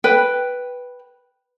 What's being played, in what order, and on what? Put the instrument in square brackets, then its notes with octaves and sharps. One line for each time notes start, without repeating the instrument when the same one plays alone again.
[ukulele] B4 G5